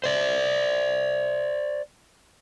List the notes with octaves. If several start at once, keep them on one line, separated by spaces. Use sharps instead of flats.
C5 D5